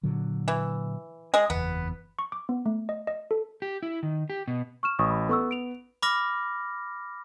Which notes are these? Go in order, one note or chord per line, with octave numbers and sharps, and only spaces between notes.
A#2 D3 F#3
E3
G#3 G#4 D#5
F#1 E2 B3
C#6
D6
B3
A3
D#5
D#5
A4
G4
E4
D#3
G4
B2
C#6 F6 E7
A1 C#6 D#6
B5
B3 A4 C#6 E6
D7 F7
B5 D6 F6 A#6